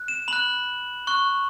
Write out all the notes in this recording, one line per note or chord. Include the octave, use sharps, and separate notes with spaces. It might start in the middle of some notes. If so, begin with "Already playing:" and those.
Already playing: F#6
E7
B5 F#6 F#7
C#6 F#6